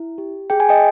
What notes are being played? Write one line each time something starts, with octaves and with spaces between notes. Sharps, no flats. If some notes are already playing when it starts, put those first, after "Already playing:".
Already playing: E4
G4
G#4 G5
G#5
D#5 G5